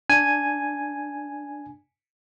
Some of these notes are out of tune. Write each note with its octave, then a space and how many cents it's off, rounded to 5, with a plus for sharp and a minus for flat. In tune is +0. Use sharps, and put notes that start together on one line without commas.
D4 -5 G#5 +0